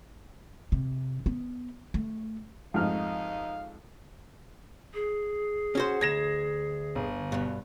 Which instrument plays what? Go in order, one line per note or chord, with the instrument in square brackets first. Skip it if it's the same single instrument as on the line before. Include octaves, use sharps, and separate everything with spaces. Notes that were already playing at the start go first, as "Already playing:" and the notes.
[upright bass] C3
B3
A3
[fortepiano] F2 G#2 F6 [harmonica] D#4 F5
[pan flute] G#4
[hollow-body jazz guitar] C#4 F#4 C5
[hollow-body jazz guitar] D2 [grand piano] G#6 A#6 E7
[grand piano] G1
[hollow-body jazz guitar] G2 B2